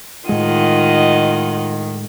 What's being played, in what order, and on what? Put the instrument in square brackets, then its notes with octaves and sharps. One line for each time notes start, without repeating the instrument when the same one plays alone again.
[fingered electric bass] A2 G#3 [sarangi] D#3 [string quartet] F4 D#5 F#5